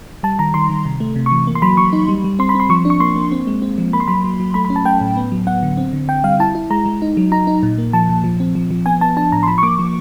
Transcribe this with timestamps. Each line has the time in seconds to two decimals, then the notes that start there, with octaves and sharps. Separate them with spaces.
0.23 G3 A5
0.39 D#3 A#5
0.54 D#3 C6
0.70 D#3
0.85 C3
1.00 A3
1.16 C3
1.26 C#6
1.31 E3
1.47 A#3
1.55 C6
1.62 F#3 B5
1.77 F#3 C#6
1.93 D#4
2.08 G3
2.24 G3
2.39 C4 C6
2.49 B5
2.55 C4 C6
2.69 F3 C#6
2.85 D4
2.90 C#6
3.00 A#3 C6
3.16 A#3
3.32 C4
3.47 G#3
3.62 C4
3.78 F3
3.93 A#3 B5
4.00 C6
4.08 F#3 B5
4.24 F#3
4.40 F#3
4.54 A3 B5
4.65 B5
4.70 C#4
4.76 A5
4.85 A3 G5
5.01 A2
5.17 B3
5.32 F#3
5.47 B3 F#5
5.63 D3
5.78 C4
5.93 D3
6.08 D3 G5
6.24 G3 F5
6.40 E4 A5
6.55 E4
6.70 G#3 A#5
6.86 G#3
7.02 D#4
7.17 F#3
7.32 D#4 A#5
7.47 D#4
7.63 A#2
7.78 A#3
7.93 F3 A5
8.09 A#2
8.24 F3
8.40 C4
8.55 F3
8.71 F3
8.86 B3 G#5
9.01 B3 A5
9.17 D4 A5
9.32 A2 A#5
9.43 C6
9.47 F3 B5
9.58 C#6
9.63 A#3 D6
9.79 F3